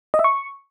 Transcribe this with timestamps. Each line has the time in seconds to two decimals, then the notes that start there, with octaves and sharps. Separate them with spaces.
0.14 D#5
0.19 E5
0.24 C#6